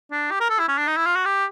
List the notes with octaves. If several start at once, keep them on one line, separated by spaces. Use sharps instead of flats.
D4
G4
A#4
A4
E4
C#4
D4
D#4
E4
F4
F#4
G4